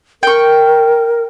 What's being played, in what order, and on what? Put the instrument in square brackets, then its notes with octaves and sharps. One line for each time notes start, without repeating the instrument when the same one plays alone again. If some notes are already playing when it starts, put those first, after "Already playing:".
[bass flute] A#4 [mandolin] G5 C#6